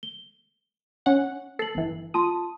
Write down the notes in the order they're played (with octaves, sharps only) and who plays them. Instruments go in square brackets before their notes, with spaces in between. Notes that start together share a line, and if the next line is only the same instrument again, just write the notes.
[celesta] G7
[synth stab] C#4 F#5
[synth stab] A4 [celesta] C7 F#7
[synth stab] G1 E3
[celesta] F4 A5 C6 [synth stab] D#6